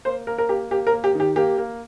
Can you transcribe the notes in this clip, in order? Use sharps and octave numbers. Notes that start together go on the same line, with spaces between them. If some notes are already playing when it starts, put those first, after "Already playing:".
A#3 C5
A#3 A#4
A#4
A#3 G4
A#3 G4
A#4
A#3
G4
D#3 G4
A#3 G4
A#3